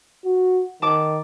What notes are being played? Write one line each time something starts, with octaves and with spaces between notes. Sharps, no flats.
F#4
D#3 A5 D6